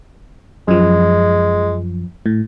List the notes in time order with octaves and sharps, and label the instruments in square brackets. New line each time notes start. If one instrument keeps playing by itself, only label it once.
[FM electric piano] F#2 F3 [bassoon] G#3
[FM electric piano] A2